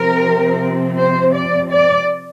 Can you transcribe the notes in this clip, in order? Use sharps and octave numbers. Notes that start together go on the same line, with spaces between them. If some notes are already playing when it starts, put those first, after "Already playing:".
Already playing: C3 F3 C4 A#4
C5
D5
D5